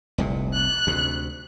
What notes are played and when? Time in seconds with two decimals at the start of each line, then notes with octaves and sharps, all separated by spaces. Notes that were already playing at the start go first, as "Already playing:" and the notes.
0.18 F1 C2 A#2
0.54 F#6
0.87 D2 C3